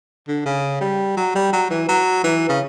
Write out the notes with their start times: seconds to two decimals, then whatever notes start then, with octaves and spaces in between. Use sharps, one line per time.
0.28 D3
0.46 C#3
0.81 G3
1.17 F#3
1.35 G3
1.53 F#3
1.71 E3
1.89 F#3
2.24 E3
2.49 C#3